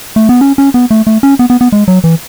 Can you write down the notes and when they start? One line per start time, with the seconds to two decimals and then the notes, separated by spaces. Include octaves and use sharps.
0.16 A3
0.29 B3
0.41 C#4
0.58 C#4
0.74 B3
0.91 A3
1.07 A3
1.23 C#4
1.39 B3
1.50 B3
1.61 B3
1.72 G#3
1.88 F#3
2.04 E3